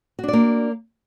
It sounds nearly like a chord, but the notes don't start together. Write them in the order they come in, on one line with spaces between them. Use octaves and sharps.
F#4 D4 D5 A#3